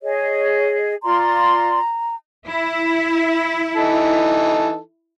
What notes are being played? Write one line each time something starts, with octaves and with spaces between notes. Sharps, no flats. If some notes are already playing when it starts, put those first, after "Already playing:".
G#4 C#5 D#5
F4 D5 A#5 C6
E4
E3 D#4 A4